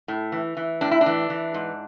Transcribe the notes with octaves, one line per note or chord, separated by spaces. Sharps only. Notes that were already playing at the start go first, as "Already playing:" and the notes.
A2
E3
E3
A2 D4
E4
D4
E3
E3
G#2